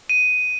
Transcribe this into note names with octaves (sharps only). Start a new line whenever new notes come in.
D#7